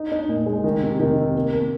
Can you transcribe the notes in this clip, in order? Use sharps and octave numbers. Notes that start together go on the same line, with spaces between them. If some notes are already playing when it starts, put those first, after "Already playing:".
Already playing: D#4
D#4
A#2
G#3
D#3
C3
D#3
C3
A#3
A#3